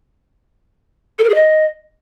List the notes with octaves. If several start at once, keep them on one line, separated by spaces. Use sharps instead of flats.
A4
A#4
G#4
D#5